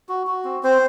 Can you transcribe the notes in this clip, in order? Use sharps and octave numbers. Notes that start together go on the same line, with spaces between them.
F#4
F#4
C4
C4 C5